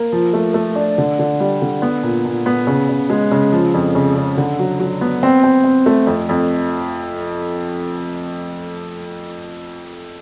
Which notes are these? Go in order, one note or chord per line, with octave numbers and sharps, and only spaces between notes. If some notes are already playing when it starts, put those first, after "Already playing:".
Already playing: A#3
F3
A3
A3
D4
D3
D3
G3
D3
B3
A#2
A#2
B3
C#3
C#3
G#3
C#3
F3
F2
C#3
C#3
D3
F#3
F#3
B3
C4
C4
C4
A3
F2
F2